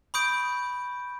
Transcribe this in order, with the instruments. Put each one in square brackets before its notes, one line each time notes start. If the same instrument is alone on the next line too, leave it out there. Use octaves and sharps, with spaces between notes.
[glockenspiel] B5 C#6 D#6 G6 D7